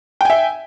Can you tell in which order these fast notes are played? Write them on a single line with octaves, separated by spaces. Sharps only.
G5 G#5 E5